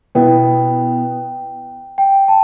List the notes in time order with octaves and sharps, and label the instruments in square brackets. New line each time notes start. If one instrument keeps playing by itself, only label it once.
[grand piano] B2 B3 E4 [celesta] G5
[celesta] G5
A5